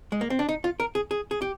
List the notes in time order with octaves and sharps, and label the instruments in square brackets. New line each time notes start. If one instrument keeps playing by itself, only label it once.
[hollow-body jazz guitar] G#3
A#3
C4
D4
D#4
F4
A#4
G#4
G#4
G#4
G4